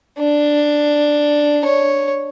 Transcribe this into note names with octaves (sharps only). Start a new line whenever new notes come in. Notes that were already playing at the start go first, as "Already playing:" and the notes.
D4
C#5